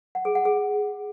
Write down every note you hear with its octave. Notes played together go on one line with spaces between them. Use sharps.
F#5
G#4
F#5
G#4